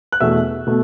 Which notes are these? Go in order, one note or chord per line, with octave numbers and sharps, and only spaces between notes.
F#6
E2 B2 A3 E5 E6
B2 A3